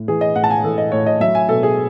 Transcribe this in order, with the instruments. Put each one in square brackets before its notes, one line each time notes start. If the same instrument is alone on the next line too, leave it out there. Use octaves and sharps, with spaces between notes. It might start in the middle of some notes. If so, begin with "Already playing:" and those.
Already playing: [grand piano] A2
E3 G#4
D#5
A2 F#5
A5
G#5
E3 A4
D#5
A2 C#5
D#5
F#3 E5
G#5
B2 A4
G#4